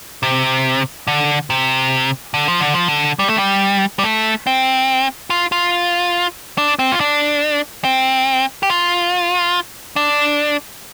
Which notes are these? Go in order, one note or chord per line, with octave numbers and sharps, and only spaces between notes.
C3
D3
C3
D3
F3
D3
F3
D3
G3
A3
G3
G3
A3
C4
F4
F4
D4
C4
F4
D4
C4
G4
F4
D4